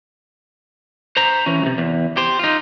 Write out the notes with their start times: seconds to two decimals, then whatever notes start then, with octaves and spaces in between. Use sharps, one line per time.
1.17 C5 A#5
1.46 E3 C#4
1.62 C#2 C3
1.78 E2
2.17 G4 C5
2.39 D#4 F4